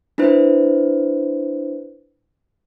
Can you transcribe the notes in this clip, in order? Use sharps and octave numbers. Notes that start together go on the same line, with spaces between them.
D4 E4 B4 C5